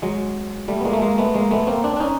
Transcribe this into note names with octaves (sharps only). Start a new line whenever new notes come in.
F#3 G#3
G3 A3
B3
G#3 A#3
A3
G#3 A#3
A3 B3
G#3 A#3
A3 B3
A#3 C4
C4 D4
D4
C#4 D#4